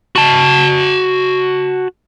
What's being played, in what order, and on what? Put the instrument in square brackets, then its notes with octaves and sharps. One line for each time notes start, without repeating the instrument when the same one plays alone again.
[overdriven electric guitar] F#4 A5